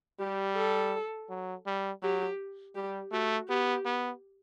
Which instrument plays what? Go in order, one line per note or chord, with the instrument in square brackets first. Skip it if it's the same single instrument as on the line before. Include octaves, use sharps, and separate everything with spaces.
[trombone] G3 [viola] G4
[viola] A4
[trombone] F#3
G3
[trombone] F#3 [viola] G4
[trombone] G3 [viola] G4
[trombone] A3 [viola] F#4
[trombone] B3 [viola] G4
[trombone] B3